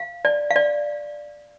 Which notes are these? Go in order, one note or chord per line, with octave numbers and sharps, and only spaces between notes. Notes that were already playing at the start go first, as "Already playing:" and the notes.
Already playing: F5
D5
F5
D5